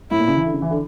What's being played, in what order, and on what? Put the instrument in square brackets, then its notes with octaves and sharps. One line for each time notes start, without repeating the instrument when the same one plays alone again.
[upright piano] A2 [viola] E4
[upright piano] A#2
C#3
E3
D3
C#3
E3
D3